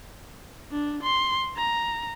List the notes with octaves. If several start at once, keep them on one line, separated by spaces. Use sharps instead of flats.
D4
C6
A#5